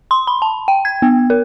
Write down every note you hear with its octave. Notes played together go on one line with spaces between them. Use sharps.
C6
B5
A5
G5
G#6
B3
A#4